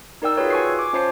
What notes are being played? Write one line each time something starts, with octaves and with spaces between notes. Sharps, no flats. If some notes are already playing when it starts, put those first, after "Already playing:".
D#4 A#4 D5 G5 E6
F4 F#4 G#4 B4 C#5
G#5 C#6 C7
D6
C#4 F4 C5 C#5 A5 C7